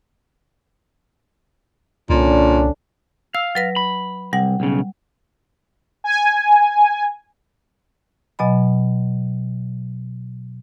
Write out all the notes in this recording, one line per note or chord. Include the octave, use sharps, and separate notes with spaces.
C2 A#2 D3 C#4 D4
F5 E6
F#3 B4 A#6
B5
C2 G3 F#5
B1 C#3
G#5
B2 F#3 D#5 G#5 B5